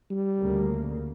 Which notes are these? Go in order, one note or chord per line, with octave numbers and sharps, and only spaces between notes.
G3
D2 C#3 A#3